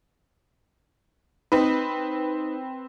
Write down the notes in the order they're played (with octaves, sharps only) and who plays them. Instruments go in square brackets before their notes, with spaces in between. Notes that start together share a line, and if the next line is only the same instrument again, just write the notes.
[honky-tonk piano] C4 B4 [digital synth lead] D#4